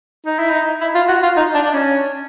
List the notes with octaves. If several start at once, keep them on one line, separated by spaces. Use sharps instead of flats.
D#4
E4
D#4
E4
F4
F#4
F4
D#4
D4
D4
C#4